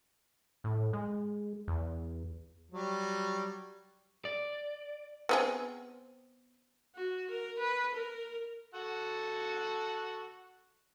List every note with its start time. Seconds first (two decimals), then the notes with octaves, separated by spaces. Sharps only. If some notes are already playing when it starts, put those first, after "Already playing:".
0.64 A2
0.93 G#3
1.68 E2
2.71 F#3 G3
4.25 D5
5.29 B3 C4 G#4
6.96 F#4
7.30 A#4
7.59 B4
7.94 A#4
8.75 F#4 A4 F#5